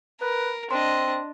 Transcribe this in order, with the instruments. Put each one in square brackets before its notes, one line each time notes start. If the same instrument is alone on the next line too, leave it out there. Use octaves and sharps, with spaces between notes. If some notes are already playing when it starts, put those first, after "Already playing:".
[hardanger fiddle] A#4 [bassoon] B4
[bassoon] C4 [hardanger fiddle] D4 D#5 [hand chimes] C6